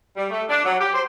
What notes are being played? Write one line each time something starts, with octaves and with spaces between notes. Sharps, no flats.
G3
A3
D4
F#3
G4
C5